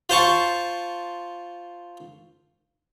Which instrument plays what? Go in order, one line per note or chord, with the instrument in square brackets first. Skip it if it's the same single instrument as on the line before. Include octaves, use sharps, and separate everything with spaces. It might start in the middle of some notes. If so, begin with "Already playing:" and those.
[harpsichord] F4 C5 A5 C#6